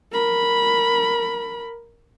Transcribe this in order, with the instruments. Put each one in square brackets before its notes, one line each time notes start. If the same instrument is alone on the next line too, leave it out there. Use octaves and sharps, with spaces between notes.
[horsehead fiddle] A#4 B5